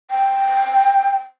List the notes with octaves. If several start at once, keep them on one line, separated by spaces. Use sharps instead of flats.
G5